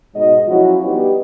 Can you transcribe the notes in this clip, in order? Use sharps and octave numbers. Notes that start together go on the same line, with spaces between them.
G#2 B2 D#5
F3 F#3 C#4 E4 F#4
G3 B3 D#4 G4